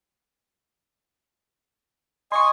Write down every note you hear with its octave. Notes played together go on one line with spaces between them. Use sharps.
D#5 G#5 C6 C#6